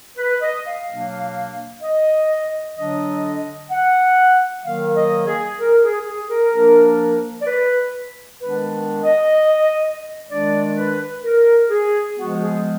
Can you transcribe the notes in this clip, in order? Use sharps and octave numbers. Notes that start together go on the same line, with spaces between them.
B4
D#5
F5
B2 F#3 A#3 D4
D#5
D3 F#3 D4 D#5
F#5
D#3 F#3 A#3 F5
D#5
G#4
A#4
G#4
G#4
A#4
F3 A#3 D4
D5
B4
D#3 G#3 B3 D4 B4
D#5
D#3 G#3 D4 D5
B4
A#4
G#4
F3 G#3 B3 F#4
G#4